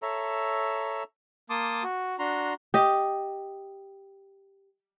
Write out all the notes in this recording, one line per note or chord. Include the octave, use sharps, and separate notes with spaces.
A4 C#5 E5 A#5
A#3 A5 C6 D6 D#6
F#4
D4 F#4 A#5 C6
G4 D#5